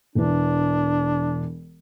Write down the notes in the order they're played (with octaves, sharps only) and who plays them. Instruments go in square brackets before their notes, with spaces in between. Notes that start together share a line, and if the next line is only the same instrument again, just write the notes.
[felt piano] E1 E3 [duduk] D4